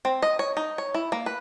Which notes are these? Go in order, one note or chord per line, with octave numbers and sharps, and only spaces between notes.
C4
D#5
C#5
D#4
C#5
E4
A#3
B4